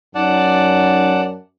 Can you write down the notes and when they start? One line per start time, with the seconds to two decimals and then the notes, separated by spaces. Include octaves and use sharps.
0.15 F#2 D#4 D5 F#5 A5